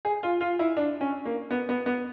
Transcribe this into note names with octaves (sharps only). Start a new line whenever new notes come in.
G#4
F4
F4
E4
D4
C#4
A#3
B3
B3
B3